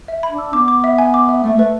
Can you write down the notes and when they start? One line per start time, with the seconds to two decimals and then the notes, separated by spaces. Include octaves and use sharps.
0.08 E5
0.23 B5
0.31 D4
0.38 E6
0.53 B3 D6
0.68 D6
0.84 E5
0.98 G#5
1.14 D6
1.29 E5
1.44 A3 E5
1.55 A3 B4